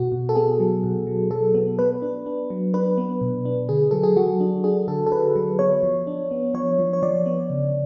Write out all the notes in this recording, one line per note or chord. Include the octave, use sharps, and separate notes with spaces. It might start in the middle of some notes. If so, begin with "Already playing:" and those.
Already playing: B2 F#4
B2
A4
B3 G#4
F#3
B2
F#3
F#3 A4
B3
B3 B4
D4
D4
F#3
D4 B4
B3
B2
D4
D3 G#4
F#3 A4
G#4
F#3 F#4
D4
D4 G#4
D3 A4
A4
D3 B4
F#3
B3 C#5
F3
D4
B3
F3 C#5
F3
C#5
F3 D5
B3
C#3